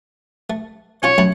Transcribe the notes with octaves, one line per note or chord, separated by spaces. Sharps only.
A3
C#4 F4 C#5 A#5
F#2 A3 B5